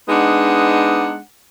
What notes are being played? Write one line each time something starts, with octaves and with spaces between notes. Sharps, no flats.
G#3 B3 D4 D#4 F#5